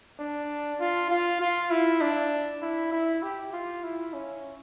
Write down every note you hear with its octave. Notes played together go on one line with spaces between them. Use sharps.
D4
F4
F4
F4
E4
D4
E4
E4
G4
F4
E4
C#4